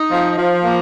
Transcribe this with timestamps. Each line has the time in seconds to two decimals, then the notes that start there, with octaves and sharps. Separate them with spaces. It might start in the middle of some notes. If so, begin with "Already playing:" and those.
Already playing: D#4
0.12 F3
0.38 F3
0.64 A#3